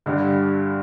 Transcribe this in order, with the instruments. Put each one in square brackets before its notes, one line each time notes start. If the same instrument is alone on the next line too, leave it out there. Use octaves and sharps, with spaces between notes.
[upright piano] G2 D3 G3 D4